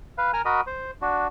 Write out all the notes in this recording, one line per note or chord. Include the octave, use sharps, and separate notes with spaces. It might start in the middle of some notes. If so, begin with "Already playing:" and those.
B4 F5
A#4 G#5 A#5 F6
F#4 A#4 D#5 B5
C5
D4 F#4